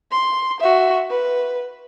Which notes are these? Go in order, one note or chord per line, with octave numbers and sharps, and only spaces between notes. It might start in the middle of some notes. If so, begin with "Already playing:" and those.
C6
F#4 E5
B4